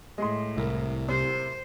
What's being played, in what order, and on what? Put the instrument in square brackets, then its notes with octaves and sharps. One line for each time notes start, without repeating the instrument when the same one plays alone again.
[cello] A2 [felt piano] G#3 [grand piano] D#5 C6
[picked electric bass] C2 [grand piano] E4 A#4
[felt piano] C3 [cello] C5